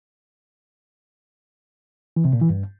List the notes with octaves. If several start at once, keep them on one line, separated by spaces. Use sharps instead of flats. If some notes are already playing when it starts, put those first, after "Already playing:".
E3
C3
A#2
E3
G2